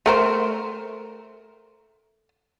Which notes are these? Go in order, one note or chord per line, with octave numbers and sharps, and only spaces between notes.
A3 A#4 C5